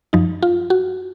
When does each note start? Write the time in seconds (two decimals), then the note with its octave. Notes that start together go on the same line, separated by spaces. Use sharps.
0.13 F#2 F3 D#4
0.43 F4
0.70 F#4